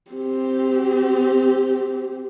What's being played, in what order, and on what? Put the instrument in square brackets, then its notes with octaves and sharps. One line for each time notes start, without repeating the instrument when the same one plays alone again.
[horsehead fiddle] C4 G4